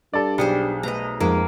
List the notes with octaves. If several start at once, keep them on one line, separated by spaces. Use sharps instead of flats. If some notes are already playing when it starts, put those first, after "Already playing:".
G2 A4 D5
B1 G3 G#4 C5 C#7
A3 B4 D#5 A#5
F2 G#2 A#3